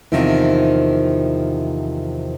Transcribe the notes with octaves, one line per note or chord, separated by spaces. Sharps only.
E2 C3 D#3 F3